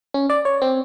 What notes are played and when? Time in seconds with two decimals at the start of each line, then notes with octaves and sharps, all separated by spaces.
0.14 C#4
0.30 D5
0.45 C#5
0.62 C4